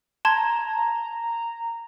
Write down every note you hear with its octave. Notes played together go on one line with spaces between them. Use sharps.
A5 A#5 C6 G#6